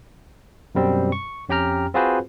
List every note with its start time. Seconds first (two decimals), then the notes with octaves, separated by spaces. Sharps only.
0.75 F#2 B2 G3 C4
1.12 C#6
1.49 F2 C#4 G4 G5 A#5 F6
1.94 C4 F4 F#4 G#4 B4 C5